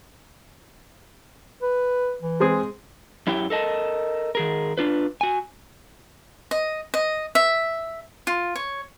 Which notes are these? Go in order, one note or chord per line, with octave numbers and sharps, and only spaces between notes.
B4
E3
G#3 C4 G#4
F#2 F#3 E4 G4 G5
A4 A#4 D#5 A5
D#3 G#4 A#4
D4 F4 B4
F#4 G#5
D#5
D#5
E5
F4
C#5